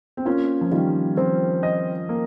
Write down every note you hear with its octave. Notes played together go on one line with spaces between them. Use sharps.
C4
A#3 C#4 F4
F3
D#3 G3 F4
F3 C4
D#5
A#3